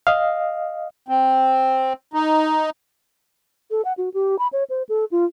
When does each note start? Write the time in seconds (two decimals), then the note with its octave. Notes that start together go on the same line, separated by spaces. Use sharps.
0.07 D#5 F5
1.08 C4
2.13 D#4
3.71 A4
3.85 F#5
3.98 F#4
4.14 G4
4.39 B5
4.53 C#5
4.70 C5
4.89 A4
5.11 F4